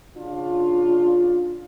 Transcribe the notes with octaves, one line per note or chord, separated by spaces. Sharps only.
C#3 D4 F4